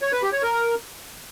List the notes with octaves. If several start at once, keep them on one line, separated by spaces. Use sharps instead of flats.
C#5
B4
G4
C#5
A#4